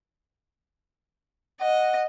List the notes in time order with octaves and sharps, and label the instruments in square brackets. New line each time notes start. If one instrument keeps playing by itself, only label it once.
[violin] D#5 [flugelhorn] F#5